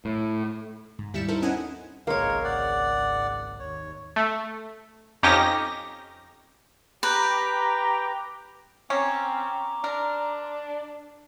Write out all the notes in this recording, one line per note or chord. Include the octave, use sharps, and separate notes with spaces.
A2
G#2
D#2 G3 E4 B6 C#7 E7
D#4 E4 A4 A#4 C5
C4 C#4 E4 D#5 F#5 G#5
G#1 C#2 G#3 A#3 A#4 C#5
D5 F#5
D#2 C#5
A3
F2 C#4 D#4 G4 A#6
G4 B4 G5 A#5
C4 C#4 A#5 C6 D6
D4 A#4